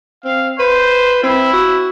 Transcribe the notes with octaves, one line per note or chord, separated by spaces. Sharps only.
C4 F5
B4 C5
C4 E4
F#4